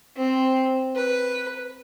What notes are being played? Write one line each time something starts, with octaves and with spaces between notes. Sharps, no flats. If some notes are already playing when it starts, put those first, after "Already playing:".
C4
B4